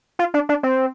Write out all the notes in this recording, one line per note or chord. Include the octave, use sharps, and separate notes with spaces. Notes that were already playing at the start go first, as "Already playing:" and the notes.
F4
D4
D4
C4